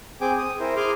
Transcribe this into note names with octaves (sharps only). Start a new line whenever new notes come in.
C4 G#4 G5 G#5 D6
D#6
E4 A#4 C5
G#4 G#5 C6 D6 F6